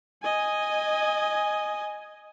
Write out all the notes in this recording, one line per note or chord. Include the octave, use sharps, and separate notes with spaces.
D#5 G#5